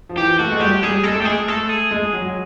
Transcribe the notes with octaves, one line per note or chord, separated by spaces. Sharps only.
F3
E3 G4
A3 F#4
G#3
G3 G4
G3 G#4
G#3 A4
A3
G4
G#3 G#4
A3 A4
G#4
G#3
F#3
F#3